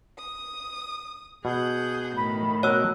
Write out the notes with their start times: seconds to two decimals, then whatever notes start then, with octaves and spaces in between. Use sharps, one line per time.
0.17 D#6
1.45 B2 G#4 F#5 G6
2.17 A2 D#3 B5
2.63 B2 A#4 C#5 E6 F#6